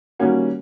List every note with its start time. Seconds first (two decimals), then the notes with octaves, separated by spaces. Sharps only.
0.19 D#3 G3 A#3 C#4 F#4